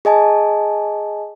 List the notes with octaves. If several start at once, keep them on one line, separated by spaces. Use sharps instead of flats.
G#4 D#5 G#5 A5